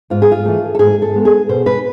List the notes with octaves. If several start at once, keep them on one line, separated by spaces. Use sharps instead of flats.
G#2 F4
G#4
F4
E3 A3
A4
G#2 G#4
A4
G#3 B3
G#4
B2 C5
B4